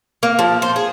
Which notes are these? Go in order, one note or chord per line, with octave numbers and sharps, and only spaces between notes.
A#3
F3
C5
G#4